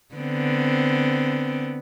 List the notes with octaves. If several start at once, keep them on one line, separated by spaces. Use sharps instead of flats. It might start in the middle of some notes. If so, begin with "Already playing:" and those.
D3 B3 C4